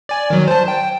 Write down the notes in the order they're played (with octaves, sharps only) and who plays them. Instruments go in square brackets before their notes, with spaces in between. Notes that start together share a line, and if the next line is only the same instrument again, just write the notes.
[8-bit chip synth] D5 G#5
D#3 F#3
C5 A5
G5